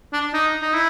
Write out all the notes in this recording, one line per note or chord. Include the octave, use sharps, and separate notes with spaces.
D4
D#4
D#4
E4